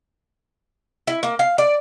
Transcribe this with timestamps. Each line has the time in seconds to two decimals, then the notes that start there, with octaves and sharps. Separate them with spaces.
1.07 E4
1.23 A#3
1.39 F5
1.58 D5